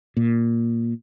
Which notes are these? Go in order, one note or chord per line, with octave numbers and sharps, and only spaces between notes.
A#2